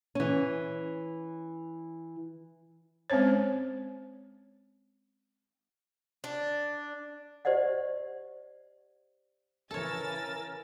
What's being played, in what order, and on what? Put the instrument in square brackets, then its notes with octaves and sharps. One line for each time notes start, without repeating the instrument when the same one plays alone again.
[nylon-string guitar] E3 C#4
[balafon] G#3 C4 C#4 C5 C#5
[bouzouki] D4
[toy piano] G4 C5 D5 D#5 F#5
[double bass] C#3 E3 [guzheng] A4 C#5 [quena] A#4 [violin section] G#5 E6 A6